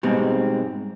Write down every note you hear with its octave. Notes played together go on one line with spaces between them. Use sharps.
G#2 B2 G3 G#3 C4